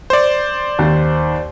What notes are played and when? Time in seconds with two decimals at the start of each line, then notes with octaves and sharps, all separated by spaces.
0.10 C5 D5
0.79 D#2